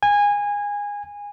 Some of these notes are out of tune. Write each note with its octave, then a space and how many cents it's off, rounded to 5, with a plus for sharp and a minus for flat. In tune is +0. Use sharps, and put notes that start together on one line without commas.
G#5 -20